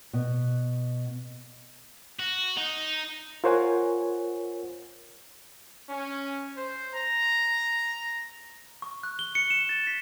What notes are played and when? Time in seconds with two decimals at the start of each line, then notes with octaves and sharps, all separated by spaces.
0.13 B2
2.19 F#4
2.57 D#4
3.44 F4 A#4 C5 C#5 F#5 G#5
5.90 C#4
6.57 C5
6.95 A#5
8.82 C#6
9.03 F#6
9.19 G7
9.35 C#7
9.50 E7
9.69 A6
9.87 B6